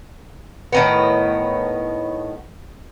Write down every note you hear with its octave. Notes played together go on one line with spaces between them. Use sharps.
A2 D#3 B3